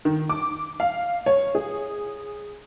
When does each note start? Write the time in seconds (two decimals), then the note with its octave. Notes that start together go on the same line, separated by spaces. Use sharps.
0.05 D#3
0.29 D6
0.80 F5
1.26 C#5
1.55 G#4